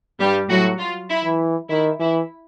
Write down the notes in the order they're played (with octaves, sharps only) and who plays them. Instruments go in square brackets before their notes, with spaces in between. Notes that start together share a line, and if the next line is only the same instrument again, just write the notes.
[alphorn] G2 [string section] G3 G4
[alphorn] A2 [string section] F#3 F#4
[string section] F4
E4
[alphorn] E3
[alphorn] D#3 [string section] E4
[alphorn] E3 [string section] E4